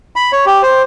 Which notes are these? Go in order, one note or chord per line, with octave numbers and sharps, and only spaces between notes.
B5
C#5
G4
C5